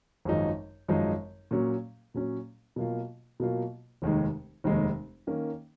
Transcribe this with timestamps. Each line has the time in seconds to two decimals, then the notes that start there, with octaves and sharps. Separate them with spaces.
0.25 G#1 F#2 F3 G#3 D#4
0.88 G#1 F#2 F3 G#3 D#4
1.51 A#2 F#3 C#4
2.14 A#2 F#3 C#4
2.76 B2 F#3 A#3 F4
3.40 B2 F#3 A#3 F4
4.02 F1 D#2 D#3 G#3
4.64 F1 D#2 D#3 G#3
5.27 D#3 A#3 C#4